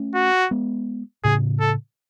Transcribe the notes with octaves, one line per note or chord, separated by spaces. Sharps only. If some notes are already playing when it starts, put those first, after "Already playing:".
Already playing: A3 C#4
F#4
G#3 B3
A2 C#3 G#4
A4